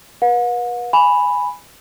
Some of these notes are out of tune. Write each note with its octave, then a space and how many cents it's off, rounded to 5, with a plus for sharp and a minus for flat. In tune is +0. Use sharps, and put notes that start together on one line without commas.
B4 -35 F#5 -45
G#5 -5 B5 +0